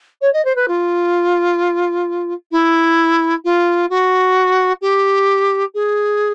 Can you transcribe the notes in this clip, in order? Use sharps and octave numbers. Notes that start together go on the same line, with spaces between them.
C#5
D#5
C5
B4
F4
E4
F4
F#4
G4
G#4